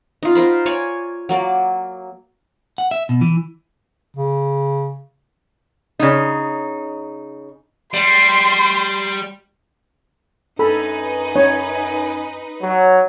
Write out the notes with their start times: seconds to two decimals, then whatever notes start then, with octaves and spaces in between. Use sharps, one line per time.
0.23 D#4 F4
0.35 F4 A#4 C5 B5
0.66 C#5 D5 G#5 C#6
1.29 F#3 A#3 D5
2.78 F#5
2.91 E5
3.09 B2
3.21 E3
4.17 C#3
5.99 C#3 D#4
7.94 G3 C6
10.59 F#2 D#4 A4 B4 G#5 B5
11.36 C#4 C#5
12.61 F#3